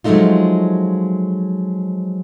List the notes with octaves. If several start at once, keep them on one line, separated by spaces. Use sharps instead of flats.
F3 F#3 G#3 A3 D#4 F4